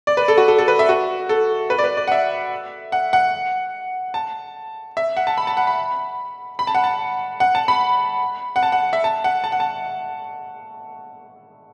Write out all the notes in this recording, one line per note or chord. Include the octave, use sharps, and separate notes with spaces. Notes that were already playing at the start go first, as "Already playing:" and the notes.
D5
B4
A4
F#4
A4
A4
B4
E5
F#4
A4
B4
D5
B4
D5
F#5
E5
F#5
F#5
A5
E5
F#5
A5
B5
A5
F#5
B5
B5
A5
F#5
A5
F#5
A5
B5
F#5
A5
F#5
E5
A5
F#5
A5
F#5
A5